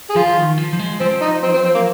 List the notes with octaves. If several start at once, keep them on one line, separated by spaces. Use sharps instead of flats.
G#4
F3 F4
D#3
F3
F3
G#3
F3 C4
D#4
C4
C4
C4
A#3